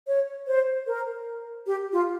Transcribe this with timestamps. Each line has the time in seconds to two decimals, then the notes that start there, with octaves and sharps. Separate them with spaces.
0.08 C#5
0.47 C5
0.87 A#4
1.67 G4
1.92 F4